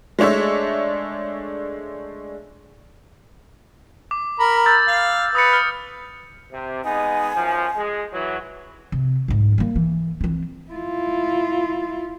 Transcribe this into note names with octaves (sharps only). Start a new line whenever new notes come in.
G#3 A3 D4 C#5 E5
D6
A#4 B5
E6 G6 A6
F5
B4 D#6 A6 C#7
F6
C3
G#3 B3 D#4 G#5
F#2 F3
G#3
E3 F#3
C3
D2 G#2
G3 A#3
E3
E3 C4
E4 F4